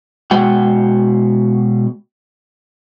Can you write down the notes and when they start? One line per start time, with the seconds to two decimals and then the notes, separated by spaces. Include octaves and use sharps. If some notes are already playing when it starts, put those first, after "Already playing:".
0.31 B2 G#3 F#4 G5